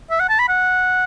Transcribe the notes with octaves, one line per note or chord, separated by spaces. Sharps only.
E5
F#5
A5
B5
F#5